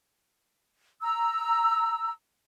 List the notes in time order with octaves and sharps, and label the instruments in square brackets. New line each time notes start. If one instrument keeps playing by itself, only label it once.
[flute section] A#5 E6